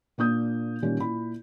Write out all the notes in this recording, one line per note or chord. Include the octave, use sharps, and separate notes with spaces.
A#2 A#3 D4 D#6 G6
A#2 D#3 G3 A#3 C#4
A#2 E4 B5